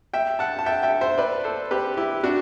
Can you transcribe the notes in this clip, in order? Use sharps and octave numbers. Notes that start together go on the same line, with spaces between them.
E5 G5
F#5 A5
A5
E5 G5
E5 G5
C5 E5
B4 D5
A4 C5
G4 B4
E4 G4
D4 F#4